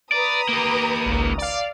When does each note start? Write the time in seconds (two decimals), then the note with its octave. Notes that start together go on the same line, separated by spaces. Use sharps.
0.12 B4 D5 A#5 D#6
0.49 A#3 G4
1.06 G#1 C#2
1.38 D5 F5